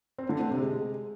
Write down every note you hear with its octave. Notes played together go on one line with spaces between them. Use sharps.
C4
D3
C4
C3
G#3